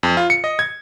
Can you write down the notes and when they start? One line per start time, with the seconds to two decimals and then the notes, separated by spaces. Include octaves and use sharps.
0.03 F2
0.17 F4
0.30 C#7
0.44 D#5
0.59 G#6